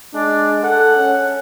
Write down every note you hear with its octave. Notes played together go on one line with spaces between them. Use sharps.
G#3 D4
A4 F#5
C#4